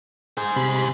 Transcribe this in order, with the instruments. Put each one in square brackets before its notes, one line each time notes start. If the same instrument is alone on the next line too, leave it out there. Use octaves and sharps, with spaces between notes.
[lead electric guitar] G#4 C5
[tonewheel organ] C3 B5